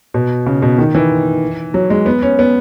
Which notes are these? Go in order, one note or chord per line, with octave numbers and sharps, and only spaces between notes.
B2
C#3
B2
D#3
E3
F#3
G#3
B3
C#4
B3